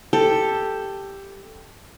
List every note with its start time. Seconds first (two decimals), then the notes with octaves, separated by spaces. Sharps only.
0.13 G4 A4